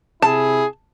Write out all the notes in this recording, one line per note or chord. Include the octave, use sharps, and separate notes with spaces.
C3 E4 G#4 A5